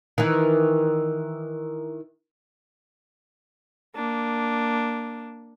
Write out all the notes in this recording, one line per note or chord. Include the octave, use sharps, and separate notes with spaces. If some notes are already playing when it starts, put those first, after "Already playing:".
D#3 E3
A#3 D4